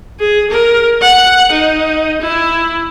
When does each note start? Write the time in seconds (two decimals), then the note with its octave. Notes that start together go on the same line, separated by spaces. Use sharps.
0.20 G#4
0.51 A#4
1.02 F#5
1.52 D#4
2.21 E4